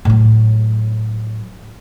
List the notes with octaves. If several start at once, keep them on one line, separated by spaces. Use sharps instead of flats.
A2 F#3